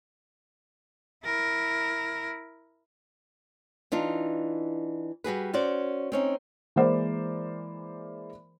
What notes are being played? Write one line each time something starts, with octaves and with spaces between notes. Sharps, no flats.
E4 A#4
E3 D4 D#4 F4
G3 F#4 G#4 B4
C#4 F#4 C5 D5
C4 C#4 D#4
E3 G#3 A#3 A#4 C5 D5